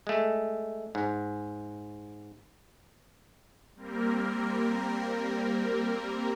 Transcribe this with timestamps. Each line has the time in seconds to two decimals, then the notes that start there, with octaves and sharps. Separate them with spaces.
0.07 G#3 A3
0.95 G#2
3.76 G3 A#3 C4 A#4